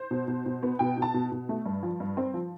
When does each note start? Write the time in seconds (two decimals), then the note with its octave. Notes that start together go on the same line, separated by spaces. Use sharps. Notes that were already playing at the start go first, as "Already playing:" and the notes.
Already playing: C5
0.11 B2
0.28 B2
0.46 B2
0.63 B3
0.79 B2 G5
0.97 B2 A5
1.14 B2
1.32 B2
1.49 A3
1.66 G2
1.83 F3
2.00 G2
2.17 C4
2.34 F3